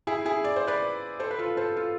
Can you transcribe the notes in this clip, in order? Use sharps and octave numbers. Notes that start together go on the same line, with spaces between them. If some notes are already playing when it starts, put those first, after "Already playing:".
E4 G#4
E4 G#4
D5
C5
B4 D5
A4 C5
B4
F4 A4
A4 C5
F4 A4